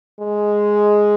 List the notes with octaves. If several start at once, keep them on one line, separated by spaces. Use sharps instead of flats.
G#3